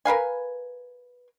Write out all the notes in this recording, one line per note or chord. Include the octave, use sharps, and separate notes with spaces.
A#4 B4 F5 G#5